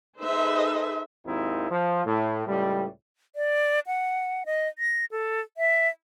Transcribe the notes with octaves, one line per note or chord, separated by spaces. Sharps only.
D#4 G#4 A4 B4 C5 E5
G#1 D#2 C4 D#4 E4
F3
A2
C#2 A2 G3
D5
F#5
D#5
A#6
A4
E5